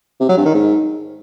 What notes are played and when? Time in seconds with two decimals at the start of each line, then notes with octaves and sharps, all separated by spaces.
0.20 C3
0.29 F#3
0.37 G2
0.45 D#3
0.54 G#2